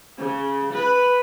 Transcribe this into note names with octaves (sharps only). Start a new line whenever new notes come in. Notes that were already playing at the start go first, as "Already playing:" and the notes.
C#3
B4